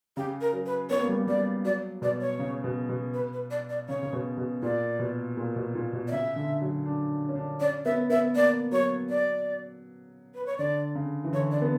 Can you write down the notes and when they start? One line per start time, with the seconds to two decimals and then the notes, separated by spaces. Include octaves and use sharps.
0.17 C#3 G4
0.41 A#4
0.53 F#3
0.66 B4
0.90 B3 C#5
1.00 A#3
1.08 G3
1.18 A#3
1.27 G3 D5
1.64 F#3 D5
2.02 B2 D5
2.21 C#5
2.39 C#3
2.64 B2
2.89 B2
3.14 B4
3.33 B4
3.51 D5
3.69 D5
3.89 C#3 C#5
4.03 C#3
4.13 B2
4.37 B2
4.62 A#2 D5
4.99 B2
5.37 A#2
5.56 B2
5.75 A#2
5.93 B2
6.08 D5
6.11 C#3 E5
6.36 D3
6.61 F#3
6.86 D4
7.29 C#4
7.35 D4
7.60 C#4 D5
7.85 B3 E5
8.10 B3 E5
8.35 A#3 D5
8.72 F#3 C#5
9.10 D5
10.35 B4
10.46 C#5
10.58 D3 D5
10.95 C#3
11.24 E3
11.33 D3 C#5
11.51 D5
11.62 B3